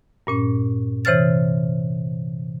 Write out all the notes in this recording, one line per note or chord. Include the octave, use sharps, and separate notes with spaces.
G2 A#2 C#4
C3 E3 C5 C#5 F6 A6